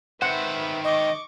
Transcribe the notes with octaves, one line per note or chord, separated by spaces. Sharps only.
D#3 B4 C5 E5 F#5
D#5 C#6 D6